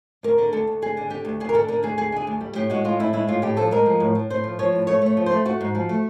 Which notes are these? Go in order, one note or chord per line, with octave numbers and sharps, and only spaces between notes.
D2 A#4
D3
D2 A4
D2
D3 G#4
D3
D3 G4
D2
D2 G#4
A#4
D3 A4
D3 A#4
D2 G#4
D2 G#4
D3 G#4
D2
G3
A2 G4
G#3 F#4
A2 F4
A2 E4
G#3 E4
A2 F4
A2 G4
F3 A4
G#3 A#4
F3
A2
A2
A2 C5
F3
F3 C#5
A2
A3 C#5
A3 C#5
F3
C5
A3
A3 F#4
G#2
F3
A3